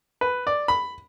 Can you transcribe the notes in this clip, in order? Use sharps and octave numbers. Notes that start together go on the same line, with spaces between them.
B4
D5
B5